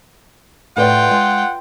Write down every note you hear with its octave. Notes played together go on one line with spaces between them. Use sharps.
A2 F4 B4 D5 F#5 G5
G#3